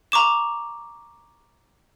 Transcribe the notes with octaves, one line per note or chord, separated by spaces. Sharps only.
A#5 C#6 D6 E7